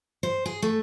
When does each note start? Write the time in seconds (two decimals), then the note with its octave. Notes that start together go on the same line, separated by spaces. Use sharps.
0.23 C5
0.46 G#4
0.62 A3